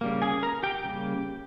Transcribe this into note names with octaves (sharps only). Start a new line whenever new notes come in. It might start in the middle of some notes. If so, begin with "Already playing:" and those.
C#3 G3 A#3
G#4 G#5
A#4 A#5
G4 G5
C#3 G3 A#3